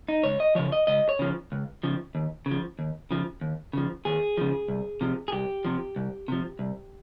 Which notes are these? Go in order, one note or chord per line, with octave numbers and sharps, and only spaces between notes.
D#4
C#2 C#5
D#5
C#3 F3 C#5
D#5
C#2 D#5
C#5
C#3 F3
C#2
C#3 F3
D#2
C#3
F3
D#2
C#3 F3
D#2
C#3 F3
D#2 G#4
C#3 F3
C2
C3 F3
G#4
C2 G4
C3 F3
C2
C3 F3
C2